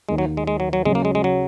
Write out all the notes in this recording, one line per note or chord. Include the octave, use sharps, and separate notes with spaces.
D#2 D#3 G#3 A#3
F#3
G#3
G#3
F#3
F#3
C#3 F#3 G#3 C#4
A#3
G#3
G#3
F#3